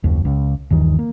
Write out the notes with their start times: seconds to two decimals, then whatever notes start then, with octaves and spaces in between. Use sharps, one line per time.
0.04 F#1 D#2
0.25 C#2
0.70 G1 D#2 D#3 E3
0.99 A#3